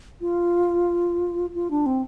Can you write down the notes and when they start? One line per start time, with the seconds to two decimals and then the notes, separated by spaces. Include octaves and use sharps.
0.21 F4
1.55 F4
1.70 D4
1.86 C4